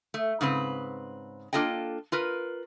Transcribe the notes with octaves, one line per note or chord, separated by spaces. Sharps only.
A3
G#2 C#3 C4 B4
A#3 D4 F4 A4 D#5 G5
F4 A#4 B4